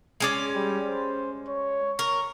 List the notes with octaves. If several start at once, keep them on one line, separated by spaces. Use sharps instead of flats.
G#3 C#4 D5
G3
C5
C#5
A#4 C#6